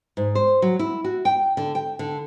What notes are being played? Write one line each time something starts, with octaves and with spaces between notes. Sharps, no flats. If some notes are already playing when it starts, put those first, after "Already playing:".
G#2
C5
F#3
E4
F#4
G5
D3
G5
D3